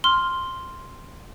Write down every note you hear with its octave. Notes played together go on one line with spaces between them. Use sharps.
C6 F6